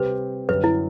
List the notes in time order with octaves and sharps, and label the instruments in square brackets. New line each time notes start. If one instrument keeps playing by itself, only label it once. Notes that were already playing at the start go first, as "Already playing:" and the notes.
Already playing: [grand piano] C3 G3 C4 G4 [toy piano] B4
[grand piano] F#2 D3 G3 [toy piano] B4
[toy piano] E4